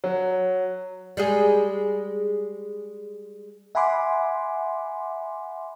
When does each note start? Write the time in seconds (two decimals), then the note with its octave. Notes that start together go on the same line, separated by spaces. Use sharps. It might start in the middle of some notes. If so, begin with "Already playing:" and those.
0.04 F#3
1.17 G3 G#3 G#4
3.75 E5 F#5 G#5 B5 C6 D6